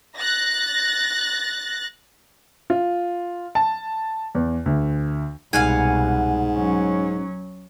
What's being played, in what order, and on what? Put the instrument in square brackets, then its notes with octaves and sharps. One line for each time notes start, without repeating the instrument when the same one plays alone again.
[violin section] F#6 A6 A#6
[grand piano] F4
A5
E2
D2
[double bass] C2 B2 [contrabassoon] G#2 [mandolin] F5 F#5 G#5
[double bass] F#3 C#4